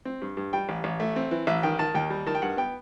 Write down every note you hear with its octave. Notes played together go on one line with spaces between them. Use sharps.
C4
G2
G2
G3 G5
A1
A1
A3
C4
E3
A1 E5
D#3 G5
D#3 A5
D#2 G5
G3
D#3 A5
G5
G2 F#5
B3 G5